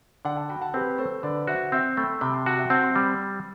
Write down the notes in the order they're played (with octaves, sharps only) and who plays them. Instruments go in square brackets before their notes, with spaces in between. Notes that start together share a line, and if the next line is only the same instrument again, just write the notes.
[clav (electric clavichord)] D3 [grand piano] D5 F#5
[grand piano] F#5 A5
[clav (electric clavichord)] F#4 [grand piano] G5 B5
[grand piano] F#5 A5
[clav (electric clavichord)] C4 [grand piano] G4 B4
[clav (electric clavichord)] A3 [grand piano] A4 C5
[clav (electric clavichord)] D3 [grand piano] B4 D5
[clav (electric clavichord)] F#4 [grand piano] C5 E5
[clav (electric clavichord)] C4 [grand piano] E5 G5
[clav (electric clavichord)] A3 [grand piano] G5 B5
[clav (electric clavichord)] C3 [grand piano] G5 B5
[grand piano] A5 C6
[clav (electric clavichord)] F#4 [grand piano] F#5 A5
[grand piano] E5 G5
[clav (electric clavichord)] C4 [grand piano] F#5 A5
[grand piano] A5 C6
[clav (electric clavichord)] G3 [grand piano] B5 D6